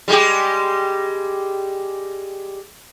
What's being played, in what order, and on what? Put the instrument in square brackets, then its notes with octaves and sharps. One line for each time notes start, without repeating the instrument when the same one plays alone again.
[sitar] G3 G#3 G4